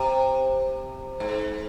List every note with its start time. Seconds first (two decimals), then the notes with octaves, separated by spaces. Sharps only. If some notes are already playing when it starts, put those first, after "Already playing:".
Already playing: C3
1.20 G#2